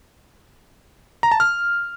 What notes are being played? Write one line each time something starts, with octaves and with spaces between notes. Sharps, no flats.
A#5
A5
F6